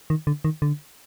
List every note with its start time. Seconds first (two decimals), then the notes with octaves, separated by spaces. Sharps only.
0.10 D#3
0.27 D3
0.45 D#3
0.62 D3